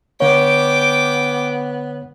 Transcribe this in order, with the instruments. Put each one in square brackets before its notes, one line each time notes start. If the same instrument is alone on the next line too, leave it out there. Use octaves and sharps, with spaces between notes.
[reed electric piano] D3 C#5 [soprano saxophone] B3 [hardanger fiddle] G5 D6